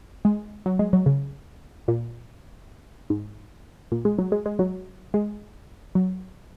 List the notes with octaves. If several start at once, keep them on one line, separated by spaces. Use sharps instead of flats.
G#3
F#3
G#3
F#3
C#3
A#2
G#2
A#2
G#3
F#3
G#3
G#3
F#3
G#3
F#3